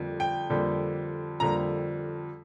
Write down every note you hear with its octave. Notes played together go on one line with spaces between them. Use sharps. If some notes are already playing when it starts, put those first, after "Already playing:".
Already playing: F2 D3 G3 A#3
G5
F2 D3 G3 A#3
F2 D3 G3 A#3 A#5